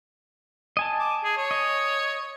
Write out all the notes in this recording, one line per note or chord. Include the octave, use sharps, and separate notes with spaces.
D#5 G#5 A5
D6
G#4
C#5
D#5